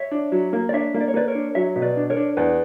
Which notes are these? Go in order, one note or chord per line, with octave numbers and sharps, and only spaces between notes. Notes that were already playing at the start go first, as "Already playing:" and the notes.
Already playing: C#5 E5
D4
F#3
A#3
D5
D4 C#5 E5
A#3
D5
C#5
A#3 B4 D5
A#4 C#5
D4
F#3 C#5 E5
B2
B4 D5
D4
A#4 C#5
D4
E2 B4 D5